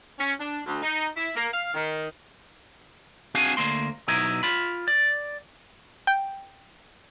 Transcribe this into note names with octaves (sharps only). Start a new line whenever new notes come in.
C#4
D4
D2
D#4
E4
A#3
F5
D#3
C4 D4 F#4 G#4 F5 G#5
D2 A#3 C6
B2 F#3 D#4 E4
F4 B5
D5
G5